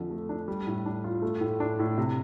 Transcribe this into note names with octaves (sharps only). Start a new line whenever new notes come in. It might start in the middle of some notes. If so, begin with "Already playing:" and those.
Already playing: F2 D3
A3
D4
G3
A2
D4
F4
A3
A2
D4
A2
C3